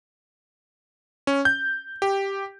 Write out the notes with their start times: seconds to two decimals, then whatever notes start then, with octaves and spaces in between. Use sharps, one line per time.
1.27 C#4
1.45 G6
2.02 G4